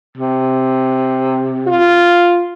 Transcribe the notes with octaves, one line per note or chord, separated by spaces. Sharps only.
C3
F4